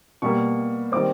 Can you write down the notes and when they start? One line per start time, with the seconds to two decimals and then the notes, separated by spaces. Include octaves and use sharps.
0.22 B2 G3 A#3 C#6
0.92 D#3 G3 C4 D6